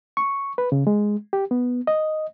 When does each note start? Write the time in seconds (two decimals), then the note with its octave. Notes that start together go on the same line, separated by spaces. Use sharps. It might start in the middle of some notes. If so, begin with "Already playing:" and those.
0.17 C#6
0.58 B4
0.72 C#3
0.87 G#3
1.33 G4
1.51 B3
1.87 D#5